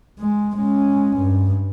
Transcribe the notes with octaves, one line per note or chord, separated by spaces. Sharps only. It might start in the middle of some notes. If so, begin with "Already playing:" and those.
G#3
G#3 C#4
G2